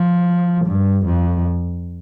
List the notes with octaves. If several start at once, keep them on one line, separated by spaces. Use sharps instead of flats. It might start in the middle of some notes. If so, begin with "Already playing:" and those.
Already playing: F3
G2
F2